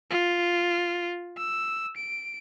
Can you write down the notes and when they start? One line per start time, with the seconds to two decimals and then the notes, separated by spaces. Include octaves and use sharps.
0.10 F4
1.37 E6
1.97 D7